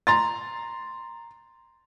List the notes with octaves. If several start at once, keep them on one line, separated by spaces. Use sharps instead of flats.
A#5 C6 A6